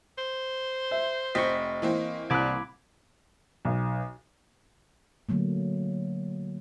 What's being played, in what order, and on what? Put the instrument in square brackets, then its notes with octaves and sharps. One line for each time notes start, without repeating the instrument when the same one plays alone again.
[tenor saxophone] C5
[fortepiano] E5
[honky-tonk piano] F1 C4 B6 [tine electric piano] D#5 C#6
[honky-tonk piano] E3 A#3 C4
[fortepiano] C2 F#6 [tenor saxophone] G3 [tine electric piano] B5 D6 G#6
[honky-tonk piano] B1
[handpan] D3 F#3 A3 A#3